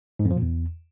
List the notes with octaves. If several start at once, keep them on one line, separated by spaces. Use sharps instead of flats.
G#2
F2
F3
A#2
E2